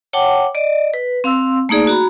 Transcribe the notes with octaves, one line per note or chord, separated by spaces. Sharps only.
C#5 F#5 G5 A5 D6
D5 D#5
B4
C4 F5 C6 E6
A3 A#3 D#4 G#4 D5
F#4 A#5 B5